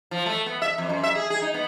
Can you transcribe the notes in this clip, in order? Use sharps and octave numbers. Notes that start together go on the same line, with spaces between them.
F3
A3
B3
E5
F2
F#2
E5
G#4
G#4
D#4
B3